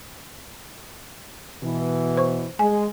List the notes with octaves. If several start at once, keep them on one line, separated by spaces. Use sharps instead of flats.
B2 E3
C5 C#6
G#3 G#5